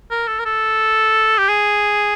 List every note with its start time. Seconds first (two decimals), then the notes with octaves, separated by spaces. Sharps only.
0.11 A#4
0.28 A4
0.39 A#4
0.45 A4
1.38 G4
1.49 G#4